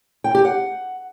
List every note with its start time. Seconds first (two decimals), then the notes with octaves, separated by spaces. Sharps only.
0.24 G5
0.35 G4
0.45 F#5